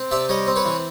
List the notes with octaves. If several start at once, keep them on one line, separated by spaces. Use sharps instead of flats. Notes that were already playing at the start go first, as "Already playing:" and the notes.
Already playing: C4
C3 D5 E5
G3 C#5 D#5
C4
B4 C#5
E3